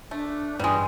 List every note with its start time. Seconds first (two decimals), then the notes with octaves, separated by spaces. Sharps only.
0.11 A3 D4
0.59 G2 E3 G3 G#3